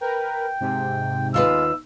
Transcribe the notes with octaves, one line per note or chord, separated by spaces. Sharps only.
A#4 B4 G5
G#2 C3
D#2 G#3 B3 F4 B4 F5 E6